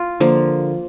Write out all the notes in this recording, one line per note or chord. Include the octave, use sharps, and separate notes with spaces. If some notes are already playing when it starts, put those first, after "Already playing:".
Already playing: F4
D3 F3 A#3